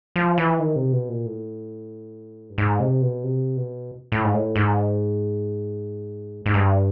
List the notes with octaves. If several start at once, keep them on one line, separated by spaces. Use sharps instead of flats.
F3
E3
D#3
C3
B2
A#2
A2
G2
G#2
C3
B2
C3
B2
A2
G#2
A2
G#2
G#2
G2